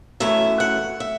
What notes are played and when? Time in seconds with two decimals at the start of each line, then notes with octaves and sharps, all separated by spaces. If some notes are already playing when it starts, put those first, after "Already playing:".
0.20 F#2 E3 A3 C#4 E5
0.60 F#5
1.00 E5